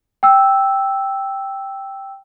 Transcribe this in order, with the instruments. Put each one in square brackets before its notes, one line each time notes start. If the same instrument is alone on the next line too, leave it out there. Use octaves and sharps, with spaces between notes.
[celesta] G5 E6